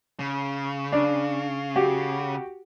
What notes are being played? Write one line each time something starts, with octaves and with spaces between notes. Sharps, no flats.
C#3
D4
F#4 G4